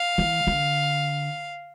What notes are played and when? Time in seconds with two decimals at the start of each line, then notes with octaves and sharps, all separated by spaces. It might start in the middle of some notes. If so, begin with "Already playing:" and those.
Already playing: F5
0.18 E3
0.47 D3